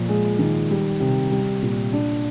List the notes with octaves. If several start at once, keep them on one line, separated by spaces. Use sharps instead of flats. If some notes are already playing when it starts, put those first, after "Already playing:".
Already playing: A#2 F3
G#3
D#3
G3
C3
G3
A#2
D4